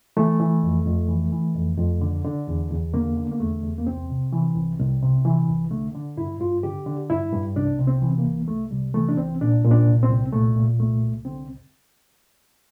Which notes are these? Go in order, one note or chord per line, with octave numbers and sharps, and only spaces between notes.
E3 A3
E3
F2
F2
E3
E3
F2
F2
D3
D3
E2
E2
D3 A#3
D3
A#3
E2 A3
E2
A#3
C2 C4
C3
E3
C2
C2
C3
E3
C2
D3 A3
D3
G2 E4
G2 F4
D3 G4
D3
G2 E4
G2
C2 D4
C3
C4
E3
A#3
C2
C2 A3
C3 G3
E3 A3
D4
C2 C4
A#2 D4
A#2
D4
C2
C4
C2
A#2 A3
A#2
C2 A3
C2
D3 C4